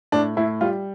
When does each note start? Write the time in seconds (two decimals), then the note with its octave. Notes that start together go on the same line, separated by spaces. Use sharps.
0.12 A2 D4
0.37 A2 E4
0.61 G3 F4